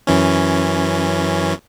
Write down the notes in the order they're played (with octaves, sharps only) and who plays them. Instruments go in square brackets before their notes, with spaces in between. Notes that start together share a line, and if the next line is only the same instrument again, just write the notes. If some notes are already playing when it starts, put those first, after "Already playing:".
[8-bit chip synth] F#2 E3 C#4